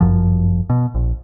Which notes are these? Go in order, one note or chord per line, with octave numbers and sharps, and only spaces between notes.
G1 F#2 F3
B2
A#1